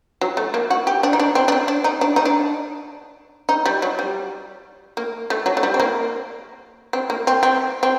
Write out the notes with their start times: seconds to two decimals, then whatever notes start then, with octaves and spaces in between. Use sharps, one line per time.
0.21 F#3
0.37 A3
0.54 A#3
0.70 F#4
0.87 G4
1.03 D4
1.13 D#4
1.20 D4
1.35 C4
1.48 D4
1.52 C4
1.68 D4
1.84 D#4
2.01 D4
2.16 D#4
2.25 D4
3.49 D#4
3.66 G3
3.82 F#3
3.99 G3
4.97 A#3
5.30 A3
5.46 F#3
5.57 A3
5.63 G3
5.74 C4
5.80 A#3
6.93 C4
7.10 A#3
7.27 C4
7.43 C4
7.83 C4